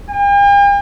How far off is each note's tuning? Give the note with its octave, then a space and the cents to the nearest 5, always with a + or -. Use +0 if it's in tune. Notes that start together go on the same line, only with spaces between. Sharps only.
G5 +45